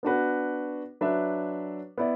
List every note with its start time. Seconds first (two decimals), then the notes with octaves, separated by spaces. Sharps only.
0.03 B3 D4 F#4 B4
1.01 F#3 D4 B4 E5
1.98 B3 E4 D5